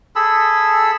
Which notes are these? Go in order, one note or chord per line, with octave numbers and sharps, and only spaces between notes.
G#4 A4 B5 E6